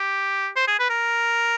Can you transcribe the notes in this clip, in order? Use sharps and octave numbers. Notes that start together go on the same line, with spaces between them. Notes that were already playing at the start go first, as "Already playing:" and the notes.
Already playing: G4
C5
G#4
B4
A#4